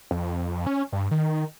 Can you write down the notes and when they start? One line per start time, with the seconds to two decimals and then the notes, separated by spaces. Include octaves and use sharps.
0.11 F2
0.67 C#4
0.92 G2
1.11 D#3